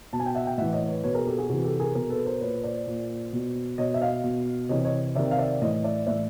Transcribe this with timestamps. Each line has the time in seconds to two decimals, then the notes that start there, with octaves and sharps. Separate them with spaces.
0.13 B2 A5
0.20 G#5
0.26 G5 A5
0.35 E5 F#5
0.47 G5
0.58 A2 E3 E5 F#5
0.73 C#5 D#5
0.88 B4 C#5
1.03 B2 B4 C#5
1.15 G#4 A#4
1.27 G4 A4
1.38 F#4 G#4
1.49 C3 E3 F#4 G#4
1.65 G4 A4
1.80 G#4 A#4
1.95 B2 G#4 A#4
2.10 A4 B4
2.25 A#4 C5
2.41 A#2 B4 C#5
2.64 C5 D5
2.87 A#2
3.33 B2
3.78 B2 C#5 D#5
3.94 E5
4.01 D#5 F5
4.24 B2
4.69 C3 E3 C#5 D#5
4.84 C#5 D#5
5.15 C3 D#3 D5 E5
5.31 F5
5.38 D5 E5
5.61 A2 E3 C#5 D#5
5.84 D5 E5
6.07 A2 E3 D5 E5